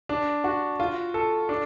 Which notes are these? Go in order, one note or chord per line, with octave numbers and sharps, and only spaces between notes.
D4
F#4
F4
A4
D4